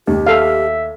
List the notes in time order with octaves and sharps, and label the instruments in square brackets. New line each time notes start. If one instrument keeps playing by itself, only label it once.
[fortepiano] D#2 [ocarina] G4
[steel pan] A4 F5 [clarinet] E5